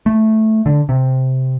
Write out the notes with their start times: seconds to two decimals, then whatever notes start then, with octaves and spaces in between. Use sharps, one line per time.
0.06 A3
0.66 D3
0.89 C3